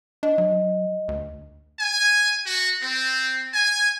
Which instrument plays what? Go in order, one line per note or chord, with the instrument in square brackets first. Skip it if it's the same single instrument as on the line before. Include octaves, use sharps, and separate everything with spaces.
[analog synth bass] D4 [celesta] D#5
[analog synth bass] F#3
D2
[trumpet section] G#5
F#4
C4
G#5